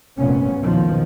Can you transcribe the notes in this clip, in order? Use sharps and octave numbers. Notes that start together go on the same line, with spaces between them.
F1 G2 A#2 B3 C#4
B1 E2 B2 D#3 F3